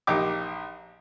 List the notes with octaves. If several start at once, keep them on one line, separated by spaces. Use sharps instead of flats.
A#1 D#4 G4 D6